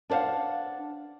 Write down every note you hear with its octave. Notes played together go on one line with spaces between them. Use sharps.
D4 B4 C5 F5 F#5